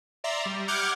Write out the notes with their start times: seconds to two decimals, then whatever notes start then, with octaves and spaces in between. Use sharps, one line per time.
0.24 D5 E5 A#5 C6
0.46 G3
0.68 F#5 D6 F6 G6 G#6